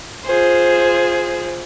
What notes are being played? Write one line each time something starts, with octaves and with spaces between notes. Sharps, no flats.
F4 G#4 C5